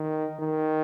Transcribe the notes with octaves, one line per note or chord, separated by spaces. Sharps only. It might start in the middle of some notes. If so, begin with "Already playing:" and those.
Already playing: D#3
D#3